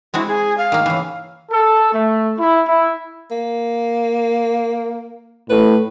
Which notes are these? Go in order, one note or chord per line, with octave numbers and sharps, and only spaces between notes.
G#3 C4 E4 F#4
G#4
F5
D#3 A#3
C#3 E3
A4
A3
E4
E4
A#3
A2 B4